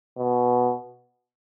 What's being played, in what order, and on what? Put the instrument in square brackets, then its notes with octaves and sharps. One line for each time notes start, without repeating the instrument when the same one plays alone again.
[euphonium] B2